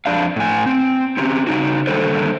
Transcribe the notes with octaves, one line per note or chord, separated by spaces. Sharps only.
F2 D4 F5
A2 G#5
C4
C4 C#4 G4
C#3 D#4 F#4
D3 D#3 G3 A#3 A4 C5